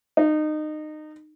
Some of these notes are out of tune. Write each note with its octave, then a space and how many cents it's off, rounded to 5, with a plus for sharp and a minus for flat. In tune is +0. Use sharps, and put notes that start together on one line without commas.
D#4 -25